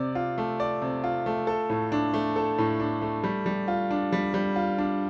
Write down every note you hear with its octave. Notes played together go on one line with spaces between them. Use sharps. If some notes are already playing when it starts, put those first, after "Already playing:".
Already playing: C3 D5
F4
A3
D5
C3
F4
A3
A4
A2
D4
A3
A4
A2
D4
A3
G3
G3
F4
D4
G3
G3
F4
D4